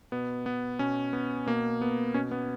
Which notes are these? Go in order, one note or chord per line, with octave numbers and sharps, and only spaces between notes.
B2 B3
B3
B2 C#4
B3
B2 A#3
B3
B2 C#4
B3